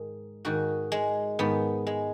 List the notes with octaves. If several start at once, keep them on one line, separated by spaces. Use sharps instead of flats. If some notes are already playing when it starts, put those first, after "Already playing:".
Already playing: G#2 D#3
G#2 D#3 F#4
G#3
G#2 D#3 B3
G#3